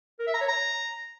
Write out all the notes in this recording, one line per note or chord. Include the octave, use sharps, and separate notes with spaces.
A#4
E5
A#5
C#5
A#5